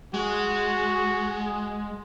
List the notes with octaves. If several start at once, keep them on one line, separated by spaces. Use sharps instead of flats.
G#3 F#4